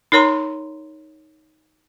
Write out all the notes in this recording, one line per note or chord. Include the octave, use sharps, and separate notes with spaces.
D#4 A#4 C#5 A#5 C6